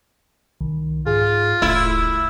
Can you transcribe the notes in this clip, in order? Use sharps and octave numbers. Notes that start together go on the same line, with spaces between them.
C2 D#3
G#2 F4 G#4
D#1 C2 A3 E4